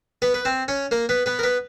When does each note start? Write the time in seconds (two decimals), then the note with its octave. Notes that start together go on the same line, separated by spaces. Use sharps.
0.22 B3 B4
0.34 B4
0.45 C4 C5
0.68 C#4 C#5
0.91 A#3 A#4
1.09 B3 B4
1.26 B3 B4
1.39 A#4
1.43 B3 B4